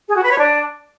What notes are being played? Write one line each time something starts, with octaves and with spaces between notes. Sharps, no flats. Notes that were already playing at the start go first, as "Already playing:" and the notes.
G#4
F#4
B4
C#5
D4